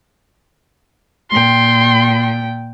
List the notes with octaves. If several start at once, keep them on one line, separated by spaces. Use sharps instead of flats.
A#2 G5 C6